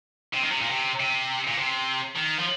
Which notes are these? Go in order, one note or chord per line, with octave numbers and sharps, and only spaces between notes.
C3
D#3
C3
A#2
C3
C3
A#2
C3
D#3
F3